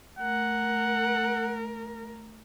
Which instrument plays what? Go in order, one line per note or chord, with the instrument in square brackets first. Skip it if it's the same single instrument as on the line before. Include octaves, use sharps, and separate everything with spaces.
[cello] A3 A#4 [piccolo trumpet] F#5